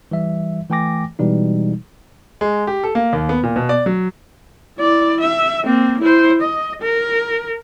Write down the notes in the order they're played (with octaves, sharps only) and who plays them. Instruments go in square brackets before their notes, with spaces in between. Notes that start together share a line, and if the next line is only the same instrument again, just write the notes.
[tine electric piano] E3 G3 E5
E3 A3 G5 G#5 D6 A#6
B2 E3 G3 G#3 D#4
[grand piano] G#3
G4
A4
A#3
D#2
B3
A#2
B2
D5
F#3
[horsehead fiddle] E4 D5
E5
A#3 C4
E4 C5
D#5
A#4